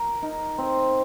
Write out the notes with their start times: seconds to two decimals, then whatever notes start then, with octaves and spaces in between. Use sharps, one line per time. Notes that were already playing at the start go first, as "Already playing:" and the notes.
Already playing: A#4
0.22 D#4
0.58 C4